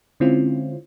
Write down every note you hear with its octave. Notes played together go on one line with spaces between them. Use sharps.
D3 G#3 C4 C#4 E4 F4